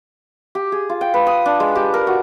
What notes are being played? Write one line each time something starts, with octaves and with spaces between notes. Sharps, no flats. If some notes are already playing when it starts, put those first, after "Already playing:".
G4
G#4
F4
G5
B4
D#6
D4
G#3
G4
A#4
F#4